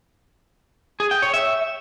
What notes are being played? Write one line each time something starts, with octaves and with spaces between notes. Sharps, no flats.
G#4
G5
C#5
E5